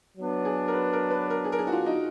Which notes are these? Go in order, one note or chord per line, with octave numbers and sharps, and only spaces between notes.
F#3 B3 D4
G#4
A#4
B4
A#4
B4
A#4
G#4
A#4
G#4
F#4
F4
D#4